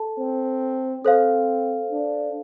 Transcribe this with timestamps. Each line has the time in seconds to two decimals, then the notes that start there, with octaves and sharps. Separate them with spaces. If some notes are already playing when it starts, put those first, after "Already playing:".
Already playing: A4 A5
0.19 C4
1.05 C4 A4 C5 F5
1.91 D4